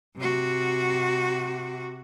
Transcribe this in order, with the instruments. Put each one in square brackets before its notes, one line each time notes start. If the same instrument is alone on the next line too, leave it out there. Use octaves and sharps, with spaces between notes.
[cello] C3 F#4